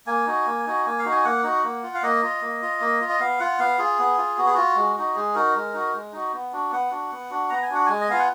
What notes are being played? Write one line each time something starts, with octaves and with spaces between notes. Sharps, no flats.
A#3 G#5
D#4 F#4
A#3
D#4 F#4
A#3 G#5
F5
D#4 F#4
G#5
A#3 F#5
D#4 F#4
A#3
F4
F5
A#3 D#5
F4
A#3
F4
A#3
F4
D#5
B3 F5
F4 F#5
B3 F5
F4 G#4
B3
F4
B3 F#4
G#4
F4 F#4
G#3
D#4 F#4
G#3 G#4
D#4 F#4 A#4
G#3
D#4 F#4
G#3
D#4 F#4
B3
D4 F#4
B3 F#5
D4 F#4
B3
D4 F#4
B3 A#5
G#5
D4 F#4 F#5
G#3 G#5
D#5
B3 F4 F5
F#5